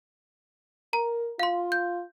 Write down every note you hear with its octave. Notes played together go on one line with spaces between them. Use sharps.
A#4 A#5
F4 F5 C6
G6